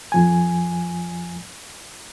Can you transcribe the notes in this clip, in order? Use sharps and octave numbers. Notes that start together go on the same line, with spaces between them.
F2 F3 G#5